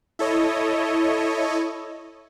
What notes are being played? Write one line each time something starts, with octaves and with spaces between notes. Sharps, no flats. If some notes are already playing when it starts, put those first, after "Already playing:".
E4 A4 C#5 D#5